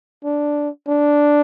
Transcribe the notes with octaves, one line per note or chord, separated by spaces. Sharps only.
D4
D4